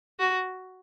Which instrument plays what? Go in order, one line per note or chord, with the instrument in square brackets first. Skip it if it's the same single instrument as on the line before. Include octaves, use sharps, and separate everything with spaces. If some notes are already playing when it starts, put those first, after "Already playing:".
[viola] F#4